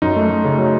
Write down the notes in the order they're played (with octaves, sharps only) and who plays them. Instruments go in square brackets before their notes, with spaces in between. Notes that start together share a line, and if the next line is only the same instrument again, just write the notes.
[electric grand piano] F#2 D#4
A3
A3
C#3
F#3